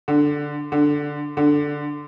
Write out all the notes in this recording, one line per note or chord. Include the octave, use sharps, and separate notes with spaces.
D3
D3
D3